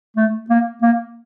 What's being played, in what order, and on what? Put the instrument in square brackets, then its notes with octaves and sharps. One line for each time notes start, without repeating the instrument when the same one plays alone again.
[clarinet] A3
A#3
A#3